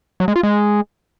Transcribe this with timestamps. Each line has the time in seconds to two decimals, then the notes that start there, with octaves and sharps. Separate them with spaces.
0.20 F#3
0.28 G#3
0.36 F4
0.43 G#3